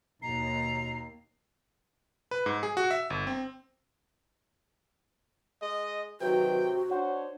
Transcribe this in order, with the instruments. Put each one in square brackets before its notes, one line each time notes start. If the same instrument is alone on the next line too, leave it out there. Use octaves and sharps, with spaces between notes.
[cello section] D#2 [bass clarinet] B2 [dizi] A#5 [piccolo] C7
[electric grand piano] B4
G#2
G#4
F#4
E5
G1
C4
[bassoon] G#3 [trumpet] D#5
[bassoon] C3 [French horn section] D#3 F#3 B4 [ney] F#4 [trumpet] G5
[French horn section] D4 C#5 [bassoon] F#4 [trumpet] C5